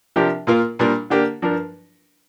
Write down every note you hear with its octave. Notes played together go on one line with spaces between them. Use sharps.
C3 F3 D4 G4 A#4
A#2 A#3 F4 A#4
A#2 G3 D4 A#4
D3 A#3 D4 G4 A#4
G2 F3 D4 A#4